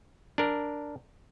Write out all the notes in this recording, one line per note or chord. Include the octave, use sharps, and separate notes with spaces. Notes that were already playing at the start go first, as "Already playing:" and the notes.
D4 A#4